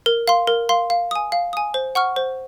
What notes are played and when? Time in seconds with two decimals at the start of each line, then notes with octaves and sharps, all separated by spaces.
0.06 A#4
0.28 F5 C6
0.47 A#4
0.69 F5 C6
0.90 F5
1.11 G#5 D#6
1.32 F5
1.53 G#5 D#6
1.74 C5
1.95 F#5 C#6 F6
2.16 C5